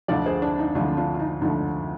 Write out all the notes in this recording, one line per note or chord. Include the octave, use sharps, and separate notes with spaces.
D2 D3 F3 D5 F5
G#4 C5
D4
D#4
D2 D3 F3 D4 F4
D4 F4
F4
D#4
D2 D3 F3 D#4